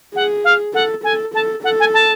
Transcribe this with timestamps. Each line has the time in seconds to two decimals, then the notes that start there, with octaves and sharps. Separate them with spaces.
0.15 G#4 F#5
0.44 F5
0.74 A4 F#5
1.04 A4 G#5
1.34 A4 A5
1.63 A4 F#5
1.80 G#5
1.93 A5